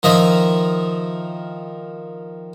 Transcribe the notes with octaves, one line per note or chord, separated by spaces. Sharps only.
D#3 F3 D#5 E5